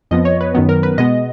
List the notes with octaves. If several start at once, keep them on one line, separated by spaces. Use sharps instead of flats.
F2 F3 B3 D#5
C#5
B4
F#2 D#3 F#3 B3
A#4
B4
B2 G#3 B3 D#5